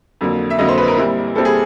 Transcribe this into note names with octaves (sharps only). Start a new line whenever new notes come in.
F2 D3 F#3 A#3
E5
F2 D3 F#3 A#3 D#5
C5
B4
A#4
A#2 G3 C4 E4
A#2 G3 C4 E4 A4
G#4